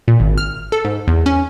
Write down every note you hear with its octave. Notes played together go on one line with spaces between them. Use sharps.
A#2
G#1
F6
A4
G#2
E2
C#4